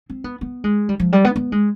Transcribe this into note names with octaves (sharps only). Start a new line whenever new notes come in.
C4
B3
B3
G#3
G3
F3
G3
B3
B3
G#3